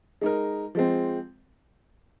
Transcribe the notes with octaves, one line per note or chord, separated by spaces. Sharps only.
G#3 D#4 A#4
F3 G#3 C4